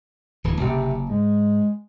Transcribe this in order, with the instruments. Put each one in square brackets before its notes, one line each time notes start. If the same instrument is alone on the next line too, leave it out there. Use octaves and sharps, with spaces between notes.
[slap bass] D1 E3
[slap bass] F#1 [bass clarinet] C3
[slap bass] G#2 [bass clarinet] G#3